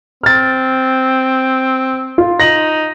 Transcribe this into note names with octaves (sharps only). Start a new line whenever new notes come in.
C4 F6 A6
F4
D#4 A#6 F#7